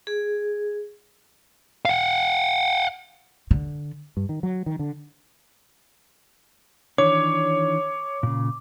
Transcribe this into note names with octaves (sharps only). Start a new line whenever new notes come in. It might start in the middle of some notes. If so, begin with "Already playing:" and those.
G#4
F5 F#5
D3
G2
D#3
F#3
D#3
D3
D#3 E3 D4 C#5 D6
A#2 C#3